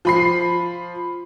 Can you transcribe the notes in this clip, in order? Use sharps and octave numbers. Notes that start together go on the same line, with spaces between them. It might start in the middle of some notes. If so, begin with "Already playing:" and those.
F3 B5 C7